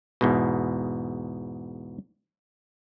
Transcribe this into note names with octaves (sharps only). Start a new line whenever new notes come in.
E2 G#2 B2